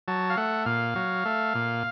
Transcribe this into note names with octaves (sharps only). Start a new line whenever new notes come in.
F#3 A5
F5
A3 F#5
A#2 F5
F#3
A3
A#2